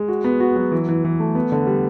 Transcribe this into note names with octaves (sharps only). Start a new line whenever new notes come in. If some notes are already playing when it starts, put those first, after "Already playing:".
Already playing: G#3
F#4
B3
F#4
F#3
E3
E3
E3
A3
B3
D3
G3